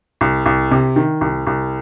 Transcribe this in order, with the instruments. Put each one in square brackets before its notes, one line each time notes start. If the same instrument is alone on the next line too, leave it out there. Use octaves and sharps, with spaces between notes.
[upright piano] C2
C2
C3
D#3
C2
C2